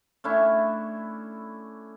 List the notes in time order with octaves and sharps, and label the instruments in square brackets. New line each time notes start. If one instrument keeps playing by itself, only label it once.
[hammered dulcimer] A3 C#4 D4 E4